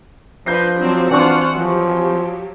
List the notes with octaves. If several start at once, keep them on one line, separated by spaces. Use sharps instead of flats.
F3 D4 B4 G6 A#6 C7
F#3 C4 D4
E3 C4 D4 F4 C5 F#5 C#6
F3 F#3 G4